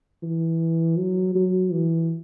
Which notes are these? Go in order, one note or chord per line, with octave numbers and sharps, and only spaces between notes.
E3
F#3
F#3
E3